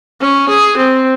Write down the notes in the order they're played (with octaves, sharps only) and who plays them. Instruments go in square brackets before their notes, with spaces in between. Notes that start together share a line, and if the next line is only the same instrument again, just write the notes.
[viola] C#4
G#4
C4